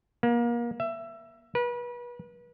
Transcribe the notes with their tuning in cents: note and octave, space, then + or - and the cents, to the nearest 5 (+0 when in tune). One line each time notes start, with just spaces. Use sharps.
A#3 +30
E5 +20
B4 -35